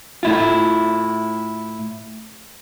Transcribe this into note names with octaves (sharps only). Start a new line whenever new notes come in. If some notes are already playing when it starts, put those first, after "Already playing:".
A2 E4 F4